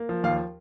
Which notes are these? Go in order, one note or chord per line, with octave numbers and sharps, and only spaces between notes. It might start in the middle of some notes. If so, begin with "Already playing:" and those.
Already playing: A#3
F3
D#2 F5